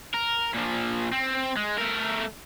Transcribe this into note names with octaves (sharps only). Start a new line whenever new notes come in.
A#4
A#2 F3
C4
G#3
A3 A#4